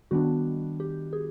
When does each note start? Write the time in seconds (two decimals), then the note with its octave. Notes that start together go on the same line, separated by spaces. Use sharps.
0.11 D#3 G3 B3 D4 F#4
0.80 G4
1.13 G#4